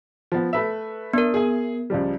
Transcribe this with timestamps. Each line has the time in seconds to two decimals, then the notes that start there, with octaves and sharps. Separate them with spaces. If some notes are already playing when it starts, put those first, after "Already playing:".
0.32 F3 B3
0.53 A3 B4 E5
1.13 B3 D4 A#4
1.34 G#4 G#5
1.90 C#2 F3 G3